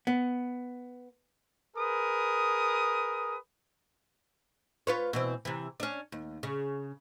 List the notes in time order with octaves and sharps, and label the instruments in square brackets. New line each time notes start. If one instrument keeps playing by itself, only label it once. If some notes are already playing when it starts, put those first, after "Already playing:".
[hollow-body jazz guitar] B3
[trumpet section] G#4 A#4 B4 D#6
[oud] F4 B4 C#5
B2 E3 C4
C3 E3
C#4 D4
D#2
C#3